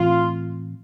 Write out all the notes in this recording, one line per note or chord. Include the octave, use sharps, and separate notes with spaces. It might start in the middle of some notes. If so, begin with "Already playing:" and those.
Already playing: A2 E3 A3 C4 F4